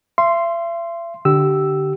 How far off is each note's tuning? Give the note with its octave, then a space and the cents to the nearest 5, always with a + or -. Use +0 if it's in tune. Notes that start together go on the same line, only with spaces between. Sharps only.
E5 +45 C6 +0
D3 +0 G4 -25 E6 +0